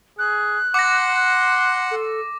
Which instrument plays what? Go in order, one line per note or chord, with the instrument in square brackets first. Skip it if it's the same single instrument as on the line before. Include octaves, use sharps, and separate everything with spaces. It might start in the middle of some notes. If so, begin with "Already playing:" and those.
[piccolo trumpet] G#4 [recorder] F#6
[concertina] F#5 [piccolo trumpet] C6 [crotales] D6 A#6
[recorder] A4